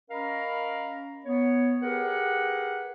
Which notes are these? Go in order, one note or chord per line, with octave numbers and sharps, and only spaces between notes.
C#4 A#4 D#5 F5 A#5 B5
B3 C#5
G4 G#4 A#4 B4 F#5